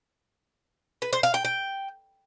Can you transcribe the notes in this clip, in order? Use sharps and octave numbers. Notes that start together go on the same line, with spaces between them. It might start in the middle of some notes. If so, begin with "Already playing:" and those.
B4
C5
F5
G5
G5